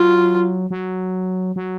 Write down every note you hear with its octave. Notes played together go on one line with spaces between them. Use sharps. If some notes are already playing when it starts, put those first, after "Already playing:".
Already playing: F#3 F4
F#3
F#3